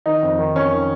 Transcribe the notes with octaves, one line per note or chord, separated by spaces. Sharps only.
D#3 D#4
F2
D#3
F2 C#4
D#3